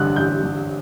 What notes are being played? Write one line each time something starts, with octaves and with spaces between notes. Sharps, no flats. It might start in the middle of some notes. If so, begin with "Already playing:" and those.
Already playing: A1 G2 D3 F#6
A1 G6
G2 D3